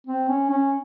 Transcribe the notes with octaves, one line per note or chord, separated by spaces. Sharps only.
C4
C#4
C#4